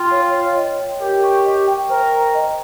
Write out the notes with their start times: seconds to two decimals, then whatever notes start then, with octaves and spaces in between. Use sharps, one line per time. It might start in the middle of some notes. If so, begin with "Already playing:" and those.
Already playing: F4 G5 C6
0.11 C#5
0.34 C#5
0.56 D#5
0.79 G5
1.01 G4 A#4
1.23 C#6
1.46 D#5
1.68 G5
1.90 A#4 C5
2.13 A#5
2.35 D#5